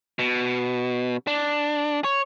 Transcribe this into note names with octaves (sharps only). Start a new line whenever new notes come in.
B2
D4
C#5